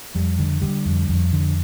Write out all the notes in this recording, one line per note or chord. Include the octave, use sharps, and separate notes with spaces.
F2 G3
D3
D3 G3
F2
F2
D3